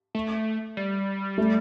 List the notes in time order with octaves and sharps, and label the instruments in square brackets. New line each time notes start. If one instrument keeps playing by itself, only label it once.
[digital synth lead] A3
G3
[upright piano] A3